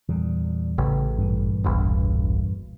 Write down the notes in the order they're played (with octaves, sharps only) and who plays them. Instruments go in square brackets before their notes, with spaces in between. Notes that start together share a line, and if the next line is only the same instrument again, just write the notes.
[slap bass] E2 A#2 G3
[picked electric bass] A1 [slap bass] C#3
[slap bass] G2 A#2 E3
[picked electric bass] E1 B1